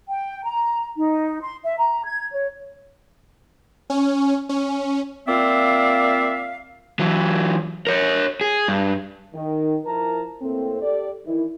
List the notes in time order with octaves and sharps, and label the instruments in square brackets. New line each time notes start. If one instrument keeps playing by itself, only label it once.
[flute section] G5
A#5
D#4
C6
E5
A#5
G#6
C#5
[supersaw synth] C#4
C#4
[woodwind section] A#3 C4 F4 D5 E5 F5
[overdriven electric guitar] E3 F#3
A#4 C#5
G#4
G2
[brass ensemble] D#3
F3 E4 A#4 A5 A#5
A2 A3 A#3 C4
G4 A4 D5
D#3 E3 E4